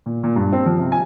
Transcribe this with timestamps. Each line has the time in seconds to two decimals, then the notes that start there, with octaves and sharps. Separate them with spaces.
0.06 A#2
0.23 A#2
0.36 G2
0.53 C4
0.66 F3
0.79 C3
0.92 G#5